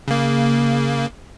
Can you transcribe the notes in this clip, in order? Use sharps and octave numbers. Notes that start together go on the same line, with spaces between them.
C#3 A#3